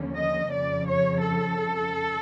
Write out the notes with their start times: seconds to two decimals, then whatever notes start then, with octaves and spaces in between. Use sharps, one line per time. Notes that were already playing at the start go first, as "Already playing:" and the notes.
Already playing: D#2 D3 F3 A#3 C#4
0.16 D#5
0.51 F2 C#3 F3 D5
0.87 C#5
1.21 A4